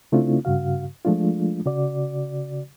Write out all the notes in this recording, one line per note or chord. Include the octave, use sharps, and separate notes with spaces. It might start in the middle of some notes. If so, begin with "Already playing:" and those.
C#3 A3 C4 D4 E4 F4
G2 C#3 F#4 F5
F3 G#3 A3 D4 F4
C#3 F#4 D5